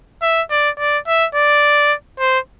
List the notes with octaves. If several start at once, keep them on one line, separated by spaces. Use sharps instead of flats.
E5
D5
D5
E5
D5
C5